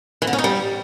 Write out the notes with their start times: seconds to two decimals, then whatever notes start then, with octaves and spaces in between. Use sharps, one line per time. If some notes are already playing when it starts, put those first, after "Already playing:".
0.22 E3
0.27 D3
0.33 C#4
0.38 D#4
0.44 G3